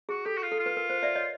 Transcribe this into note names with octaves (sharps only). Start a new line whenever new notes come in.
F#4 G#4
G4 A4
F#4
F4
A4
F4
B4
A#4
C5
D5 E5
C#5 D#5